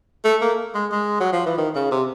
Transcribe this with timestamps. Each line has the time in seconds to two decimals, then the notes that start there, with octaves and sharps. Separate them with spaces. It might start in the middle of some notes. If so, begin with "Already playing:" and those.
0.25 A3
0.42 A#3
0.75 G#3
0.92 G#3
1.20 F#3
1.33 F3
1.46 E3
1.58 D#3
1.75 C#3
1.92 C3